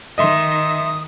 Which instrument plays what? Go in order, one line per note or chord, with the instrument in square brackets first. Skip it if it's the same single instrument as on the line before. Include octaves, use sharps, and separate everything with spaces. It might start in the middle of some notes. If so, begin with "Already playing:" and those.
[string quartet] D#3 [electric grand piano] D#5 E5 C6 [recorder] D#6